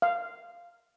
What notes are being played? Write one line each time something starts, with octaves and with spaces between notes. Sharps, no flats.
F5